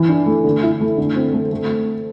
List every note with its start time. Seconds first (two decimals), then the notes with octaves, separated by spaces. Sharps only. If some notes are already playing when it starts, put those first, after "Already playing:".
Already playing: E3
0.09 D4
0.26 A3
0.44 D3
0.62 E4
0.80 A3
0.98 D3
1.16 C4
1.33 A3
1.52 A3